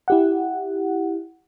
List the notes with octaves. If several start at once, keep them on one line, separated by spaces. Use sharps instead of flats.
E4 G4 F#5